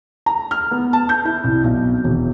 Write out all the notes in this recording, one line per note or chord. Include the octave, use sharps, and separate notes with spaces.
A#5
F6
B3
A5
G6
E4
C2
B1
E1